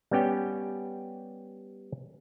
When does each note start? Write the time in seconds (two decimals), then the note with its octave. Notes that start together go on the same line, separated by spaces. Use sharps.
0.11 G3 B3 C#4 G4 G5